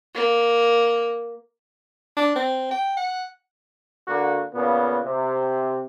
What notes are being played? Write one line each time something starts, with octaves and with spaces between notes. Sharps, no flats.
A#3
D4
C4
G5
F#5
D3 A#3 F#4
A#2 C#3 B3
C3